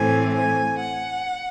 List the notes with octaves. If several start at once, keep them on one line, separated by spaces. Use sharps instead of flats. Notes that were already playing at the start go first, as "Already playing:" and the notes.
Already playing: A2 E3 A3 C4 G#5
G#5
F#5